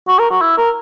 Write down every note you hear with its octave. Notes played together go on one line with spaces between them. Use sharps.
F#4
A#4
F#4
E4
A#4